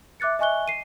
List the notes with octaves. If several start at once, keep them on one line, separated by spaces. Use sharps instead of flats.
E5 D6 F#6 A6 C#7
D#5 E5 G#5 C#6 F#6 G7
C7 D#7